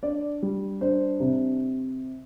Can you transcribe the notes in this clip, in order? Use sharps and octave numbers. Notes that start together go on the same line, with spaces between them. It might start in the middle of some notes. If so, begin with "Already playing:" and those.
D4 D5
G3
D4 C5
C3